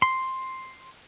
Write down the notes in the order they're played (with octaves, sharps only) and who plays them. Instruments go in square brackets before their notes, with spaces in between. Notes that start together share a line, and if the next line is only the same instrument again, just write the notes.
[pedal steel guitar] C6